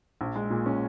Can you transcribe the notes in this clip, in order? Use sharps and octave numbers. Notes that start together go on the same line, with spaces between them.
A#1
G#3
A#2
C#4